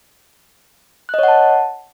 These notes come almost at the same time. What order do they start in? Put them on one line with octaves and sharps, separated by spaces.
F#6 D#5 C#5 F#5 A5